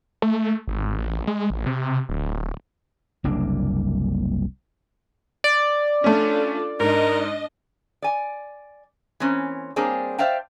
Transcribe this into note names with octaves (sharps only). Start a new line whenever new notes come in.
A3
G#1
A1
G#3
A1
C3
D1
F#1 C2 A#3 D4
D5
A3 C#4 D4 F4 A4
G#2 D4 A#4 D#5
D5 G#5
E3 A#3 C4 C#4
G3 A#3 C4 D4 G#4 C#5
C5 D5 E5 F5 G5 A5